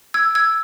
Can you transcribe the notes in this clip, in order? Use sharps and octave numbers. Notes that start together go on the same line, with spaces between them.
E6 G#6
E6 G#6